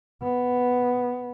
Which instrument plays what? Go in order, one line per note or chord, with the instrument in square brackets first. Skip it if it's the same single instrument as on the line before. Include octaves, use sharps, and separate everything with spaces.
[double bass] B3